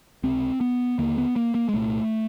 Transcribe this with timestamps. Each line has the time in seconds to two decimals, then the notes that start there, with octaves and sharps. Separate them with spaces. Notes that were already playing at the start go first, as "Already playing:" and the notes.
0.23 C#2 C3 C4
0.61 B3
0.98 D#2 D3 A#3
1.18 B3
1.36 A#3
1.55 A#3
1.69 G#3
1.73 C2 A#2 A3